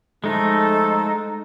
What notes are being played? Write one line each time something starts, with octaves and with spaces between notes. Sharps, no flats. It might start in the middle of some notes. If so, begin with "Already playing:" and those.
F3 G#3 A3 D#4 A4